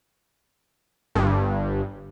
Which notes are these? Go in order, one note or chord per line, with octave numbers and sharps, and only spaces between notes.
G1 G2